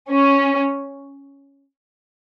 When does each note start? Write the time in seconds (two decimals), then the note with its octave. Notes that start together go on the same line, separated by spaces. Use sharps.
0.11 C#4